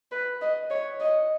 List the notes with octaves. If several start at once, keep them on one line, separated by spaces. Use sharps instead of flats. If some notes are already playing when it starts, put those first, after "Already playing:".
B4
D#5
C#5
D#5